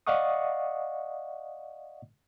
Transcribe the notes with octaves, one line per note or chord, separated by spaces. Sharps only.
D5 D#5 F5 F#5 C#6 D#6